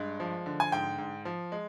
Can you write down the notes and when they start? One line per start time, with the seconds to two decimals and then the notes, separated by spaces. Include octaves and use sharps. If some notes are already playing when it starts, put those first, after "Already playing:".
Already playing: G2 G#3
0.20 F3
0.46 D3
0.60 G#5
0.72 G#2 G5
0.98 G#2
1.25 F3
1.52 G#3